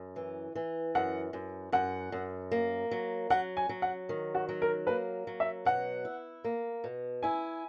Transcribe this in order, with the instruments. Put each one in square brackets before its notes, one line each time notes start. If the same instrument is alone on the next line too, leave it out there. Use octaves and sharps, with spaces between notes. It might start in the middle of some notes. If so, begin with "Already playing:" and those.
Already playing: [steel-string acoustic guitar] F#2
E3
E3
[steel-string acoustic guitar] F#2 [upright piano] F#5
[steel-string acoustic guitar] F#2
[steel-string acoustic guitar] F#2 [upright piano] F#5
[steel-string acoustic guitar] F#2
A#3
F#3
[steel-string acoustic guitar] F#3 [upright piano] F#5
[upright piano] G#5
[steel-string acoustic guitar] F#3
[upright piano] F#5
[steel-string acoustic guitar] D#3
[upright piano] F#4
[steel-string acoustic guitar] F#3
[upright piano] A#4
[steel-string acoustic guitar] A#3 [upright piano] B4
[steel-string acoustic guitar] F#3
[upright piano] E5
[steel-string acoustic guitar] B2 [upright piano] F#5
[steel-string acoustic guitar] E4
A#3
B2
[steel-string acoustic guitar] E4 [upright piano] G#5